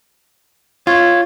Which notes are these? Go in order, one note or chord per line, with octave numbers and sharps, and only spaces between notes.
F4 C#5